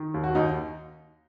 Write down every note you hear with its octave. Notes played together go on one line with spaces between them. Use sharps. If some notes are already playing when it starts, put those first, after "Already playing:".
Already playing: D#3
D#2
F#4
D#2 D#4